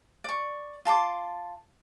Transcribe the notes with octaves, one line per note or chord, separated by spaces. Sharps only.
D5 C#6
F4 A5 C6 D6